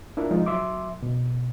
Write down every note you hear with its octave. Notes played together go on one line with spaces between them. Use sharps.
D4 E4 F4 A#4
F3 G#3 D#4 F4
F#3 E5 C6 D6
B2